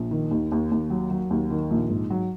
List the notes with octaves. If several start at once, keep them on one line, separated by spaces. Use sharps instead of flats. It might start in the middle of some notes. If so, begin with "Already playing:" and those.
Already playing: A#1
D#3
D#2
D#2
D#2
F#3
F#3
D#2
D#3
A#1
G#2
F#3